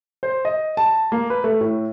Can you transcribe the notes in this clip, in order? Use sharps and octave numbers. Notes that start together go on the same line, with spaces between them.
C5
D#5
A5
A#3
B4
A3
A2